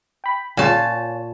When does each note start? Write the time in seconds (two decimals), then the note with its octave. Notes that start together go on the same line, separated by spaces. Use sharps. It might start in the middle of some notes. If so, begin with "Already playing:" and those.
0.24 G5 B5
0.57 A#2 F4 C#5 G#5 A5